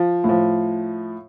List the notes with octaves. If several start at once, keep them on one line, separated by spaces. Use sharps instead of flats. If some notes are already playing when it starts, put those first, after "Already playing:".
Already playing: F3
A2 F3